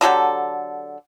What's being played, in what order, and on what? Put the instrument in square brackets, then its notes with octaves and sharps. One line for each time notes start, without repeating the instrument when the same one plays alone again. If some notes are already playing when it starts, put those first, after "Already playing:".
[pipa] D3 F#3 G4 A4